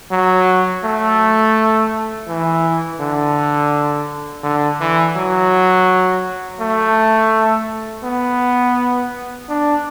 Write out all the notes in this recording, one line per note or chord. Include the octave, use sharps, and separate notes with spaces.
F#3
A3
E3
D3
D3
E3
F#3
A3
B3
D4